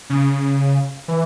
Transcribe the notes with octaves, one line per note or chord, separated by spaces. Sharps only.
C#3
E3